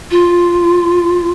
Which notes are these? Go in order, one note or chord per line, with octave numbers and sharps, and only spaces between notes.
F4